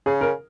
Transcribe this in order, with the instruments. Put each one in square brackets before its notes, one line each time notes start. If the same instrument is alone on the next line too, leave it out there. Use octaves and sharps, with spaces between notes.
[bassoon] C#3 [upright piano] G#4
[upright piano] A#4